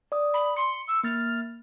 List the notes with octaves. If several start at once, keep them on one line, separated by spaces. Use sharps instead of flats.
D5 D#6
B5
C6 C#7
E6
A#3 F6 A6